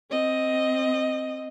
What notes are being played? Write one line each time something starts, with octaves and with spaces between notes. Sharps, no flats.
C4 D#5